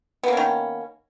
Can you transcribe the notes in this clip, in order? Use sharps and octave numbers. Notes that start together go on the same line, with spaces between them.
D#3 A#3 B3 C#4